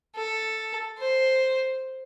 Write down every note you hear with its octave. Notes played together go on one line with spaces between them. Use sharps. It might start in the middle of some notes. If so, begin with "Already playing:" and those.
A4
C5